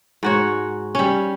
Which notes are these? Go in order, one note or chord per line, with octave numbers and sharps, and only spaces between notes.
G#2 F#4 C#5
G3 C#4